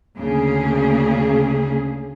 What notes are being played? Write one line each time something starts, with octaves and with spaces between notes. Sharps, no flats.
D2 C#3 A#3 G#4